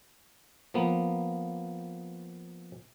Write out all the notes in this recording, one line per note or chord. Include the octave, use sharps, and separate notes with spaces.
F3 A#3 B3